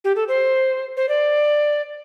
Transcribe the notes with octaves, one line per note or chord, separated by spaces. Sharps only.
G4
A4
C5
C5
D5